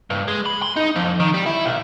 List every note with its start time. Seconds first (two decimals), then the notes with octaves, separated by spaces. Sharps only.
0.10 G2
0.28 G#3
0.46 B5
0.62 C6
0.76 D#4
0.96 F2
1.20 D#3
1.34 G3
1.46 E4
1.66 B1